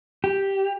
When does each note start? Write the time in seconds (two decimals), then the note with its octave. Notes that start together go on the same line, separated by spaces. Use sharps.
0.24 G4